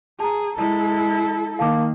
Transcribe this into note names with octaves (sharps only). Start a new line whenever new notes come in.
G#4 A5 A#5
G#3 E4 A4
D#3 A#3 F5 A5 D6